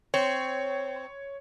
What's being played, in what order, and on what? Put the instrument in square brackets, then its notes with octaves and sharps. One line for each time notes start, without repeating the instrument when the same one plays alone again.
[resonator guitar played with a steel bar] C4 [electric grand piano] C#5